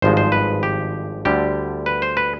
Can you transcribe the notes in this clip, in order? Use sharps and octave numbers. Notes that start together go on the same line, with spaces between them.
G#1 G2 F3 G#3 C5
C5
B4
G4
D2 D3 G3 G4
B4
C5
B4